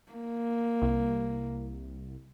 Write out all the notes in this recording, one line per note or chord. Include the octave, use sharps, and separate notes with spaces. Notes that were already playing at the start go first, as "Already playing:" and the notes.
A#3
C2